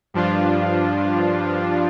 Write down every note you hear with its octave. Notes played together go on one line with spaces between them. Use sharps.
G2 F3 D4 F4